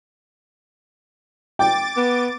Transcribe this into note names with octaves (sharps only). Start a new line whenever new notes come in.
G5 D6 A6
B3